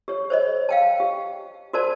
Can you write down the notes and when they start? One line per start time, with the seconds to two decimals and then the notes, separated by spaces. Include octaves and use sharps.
0.08 G4 C#5
0.30 C5 C#5 D#5
0.69 F5 G5 A5
1.00 G4
1.73 F#4 A#4 C5 D5 A5